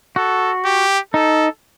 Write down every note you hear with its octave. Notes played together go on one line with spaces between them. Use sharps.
F#4 A4
G4
D#4 A4